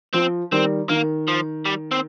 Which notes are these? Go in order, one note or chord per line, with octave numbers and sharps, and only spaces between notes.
F3 C4
D#3 G3 C4
D#3 A#3
F3
G3
C4